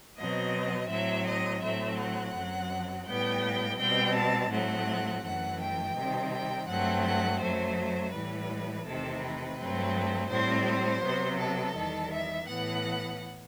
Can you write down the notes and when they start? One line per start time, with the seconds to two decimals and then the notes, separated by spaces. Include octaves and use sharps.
0.17 B2 F#3 C4 D#5
0.89 A2 F#3 C4 E5
1.26 D#5
1.62 A2 F#3 A3 C4 E5
1.98 F#5
2.34 F#2 F#3 C4
3.06 A2 G3 B3 G5
3.78 B2 G3 C4 G5
4.15 A5
4.50 A2 F#3 A3 C4 F#5
5.23 F#2 E3 A3 F#5
5.60 G5
5.95 C3 D#3 G3 C4
6.31 G5
6.68 G2 F#3 A3 C4 F#5
7.05 F#5
7.40 F#2 F#3 A3 C5
8.12 A2 E3 G3 B4
8.85 E2 C3 D#3 A3 C4 A4
9.20 B4
9.57 G2 F#3 A3 C4
10.29 A2 G3 C4 C5
10.65 C5
11.02 C3 F#3 B3
11.38 A4
11.74 E2 D#3 G3
12.10 E5
12.46 A2 E3 B3 F#5